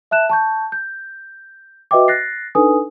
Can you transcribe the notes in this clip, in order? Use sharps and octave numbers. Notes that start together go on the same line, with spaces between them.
E5 A5 F#6 E7
A5 C#6 G6
G6
F#4 B4 D#5 E5 G5 D6
F#6 A6 A#6 C7
D4 D#4 A4 B4 G#5 D#6